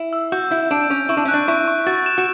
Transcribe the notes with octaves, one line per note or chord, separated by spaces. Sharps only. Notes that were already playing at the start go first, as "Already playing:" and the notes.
Already playing: E4
E6
F#4 G6
E4 G6
D4 D7
C#4 D7
E4 C#6
D4
C#4 F#6
D4
E4 C#6
C#6
F#4 A6
E7
F#4